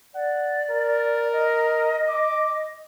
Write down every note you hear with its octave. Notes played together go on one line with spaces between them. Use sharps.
D5 F#5
A#4
D#5
D6